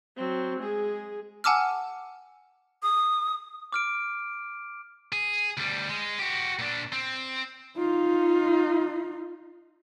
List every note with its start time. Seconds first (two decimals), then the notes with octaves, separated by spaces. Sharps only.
0.17 F#3 C4
0.59 G#3 G#4
1.44 F#5 G#5 A5 D6 E6 F6
2.83 D#6
3.72 D6 F6 D7
5.12 G#4
5.57 D2 G3
5.89 G#3
6.19 F#4 G4
6.59 A#2 D4
6.92 C4
7.77 D#4 F4